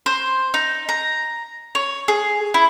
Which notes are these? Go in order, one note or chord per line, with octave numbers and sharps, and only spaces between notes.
C5
D#4
A#5
C#5
G#4
E4